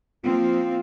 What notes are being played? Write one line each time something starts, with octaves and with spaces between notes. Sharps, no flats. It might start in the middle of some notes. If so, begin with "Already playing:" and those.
F3 A#3 C4 F4